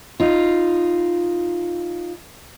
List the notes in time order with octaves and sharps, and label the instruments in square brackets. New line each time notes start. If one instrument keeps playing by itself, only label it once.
[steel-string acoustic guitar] D#4 F4